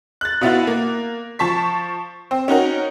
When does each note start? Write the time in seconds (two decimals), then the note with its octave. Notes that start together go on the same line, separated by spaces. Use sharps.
0.21 F#6 A6
0.41 B2 B3 E4 F4
0.67 A#3
1.39 F3 A5 C#6 B6
2.31 C4
2.48 C#4 D#4 F#4 A#4